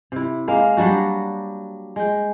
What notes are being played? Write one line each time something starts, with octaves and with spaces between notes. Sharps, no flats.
C3 E4
G#3 A#3 F5
F#3 G3 D4 F#4
G#3 G5